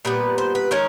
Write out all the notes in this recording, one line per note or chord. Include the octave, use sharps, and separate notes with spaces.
A#2 G3 B3 B4
C5
B4
D#3 G#3 C#4 A#4